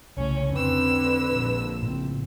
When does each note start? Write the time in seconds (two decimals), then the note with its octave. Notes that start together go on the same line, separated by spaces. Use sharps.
0.17 C2 A2 C#3 C#4 C#5
0.50 F2 D3 C4 B4 E6
1.31 A#1
1.82 A2 C#3 C4